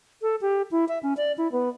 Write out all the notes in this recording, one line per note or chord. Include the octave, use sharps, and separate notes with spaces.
A4
G4
E4
E5
C#4
D5
E4
B3